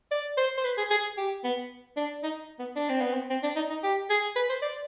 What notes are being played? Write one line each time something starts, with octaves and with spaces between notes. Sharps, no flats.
D5
C5
C5
B4
G#4
G#4
G4
B3
D4
D#4
B3
D4
C4
B3
C4
C4
D4
D#4
D#4
G4
G#4
B4
C5
D5